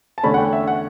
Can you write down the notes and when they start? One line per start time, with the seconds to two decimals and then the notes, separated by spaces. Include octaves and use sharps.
0.18 A5
0.23 E2 D3 A3 C#4 B5
0.34 F#5
0.38 G5
0.53 E5
0.68 F#5